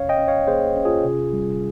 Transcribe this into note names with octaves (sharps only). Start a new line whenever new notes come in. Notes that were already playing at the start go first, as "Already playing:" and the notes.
Already playing: C#4 C#5 F5
D#5 G5
C#4
C#5 F5
A#3 G#4 C5
C#4
F4 G#4
C3
G3